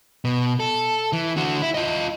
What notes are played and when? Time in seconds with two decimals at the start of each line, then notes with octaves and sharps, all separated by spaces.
0.25 B2
0.60 A4
1.13 E3
1.36 D3 F#4
1.62 E4
1.74 F4 D#5